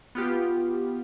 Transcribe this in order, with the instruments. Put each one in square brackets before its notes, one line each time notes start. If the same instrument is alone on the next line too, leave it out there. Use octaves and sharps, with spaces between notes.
[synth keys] B3 F4 G4